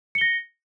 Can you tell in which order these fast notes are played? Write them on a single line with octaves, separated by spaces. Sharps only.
C#7 G7 A#6